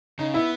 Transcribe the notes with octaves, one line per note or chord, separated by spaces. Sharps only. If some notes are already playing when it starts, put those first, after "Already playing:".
C#3 D#4
B3 E4